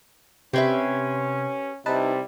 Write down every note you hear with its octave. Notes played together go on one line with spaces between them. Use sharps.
C3 C#4 G4 B4 E5 C6 G#6
C3 G3 D#4 E4 B4 A5